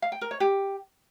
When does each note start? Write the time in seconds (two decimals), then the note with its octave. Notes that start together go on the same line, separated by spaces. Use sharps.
0.02 F5
0.12 G5
0.21 A#4
0.31 C#5
0.40 G4